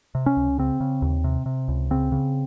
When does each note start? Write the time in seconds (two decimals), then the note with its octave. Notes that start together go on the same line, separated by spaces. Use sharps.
0.15 C3
0.26 C#4
0.37 C#2
0.58 C#3 C4
0.80 C#3
1.02 D#2
1.24 C3
1.46 C3
1.68 C#2
1.91 C#3 C4
2.12 C#3